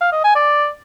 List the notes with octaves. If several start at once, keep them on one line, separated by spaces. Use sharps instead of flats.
F5
D#5
G#5
D5